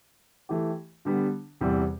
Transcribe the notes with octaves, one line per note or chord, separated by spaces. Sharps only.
E3 A3 E4 G4
D3 G3 B3
E2 C3 E3 G3 C4